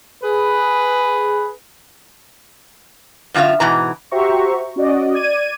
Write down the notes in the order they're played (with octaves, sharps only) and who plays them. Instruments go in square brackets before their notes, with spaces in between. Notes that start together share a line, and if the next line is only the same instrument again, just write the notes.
[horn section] G#4 B4
[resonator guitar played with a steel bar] F#2 D3 F4 E5 F5
G#2 B2 E3 A#5
[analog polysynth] F#4 G4 C5 E5 A#5 C#6
C#4 F#4 D5 D#5
D5 G#6 D#7